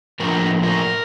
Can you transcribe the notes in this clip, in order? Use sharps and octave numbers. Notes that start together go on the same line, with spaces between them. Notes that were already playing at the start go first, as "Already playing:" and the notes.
A2 F3 A#3 D4 A#4
A#4